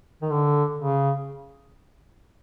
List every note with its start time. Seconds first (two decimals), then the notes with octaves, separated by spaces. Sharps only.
0.22 D#3
0.31 D3
0.78 C#3